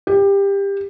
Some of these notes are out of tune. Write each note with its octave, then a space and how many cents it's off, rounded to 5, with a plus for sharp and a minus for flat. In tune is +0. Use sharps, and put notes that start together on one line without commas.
G4 +20